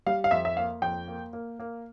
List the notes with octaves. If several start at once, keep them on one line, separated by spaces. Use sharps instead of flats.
G3 F5
F5
F2 E5
E5
A#3 F5
F2 G5
A#3
A#3
A#3